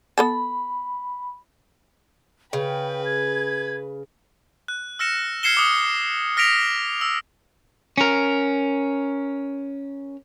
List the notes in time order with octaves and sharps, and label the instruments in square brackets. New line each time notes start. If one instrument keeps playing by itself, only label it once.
[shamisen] B3 A4 A5 [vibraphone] B5
[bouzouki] C#3 [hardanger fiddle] B4 [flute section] G5
[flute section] G#6
[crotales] F#6
E6 F6 A#6 C#7 E7
F6 G#6 C7 C#7 E7 G7
D6 D#6 C#7
F6 A#6 B6 D7 F7
E6
[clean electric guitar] C#4 A#4